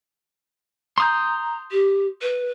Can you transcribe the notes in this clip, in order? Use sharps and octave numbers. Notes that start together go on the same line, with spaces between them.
A#5 C6 D#6 G6
G4
B4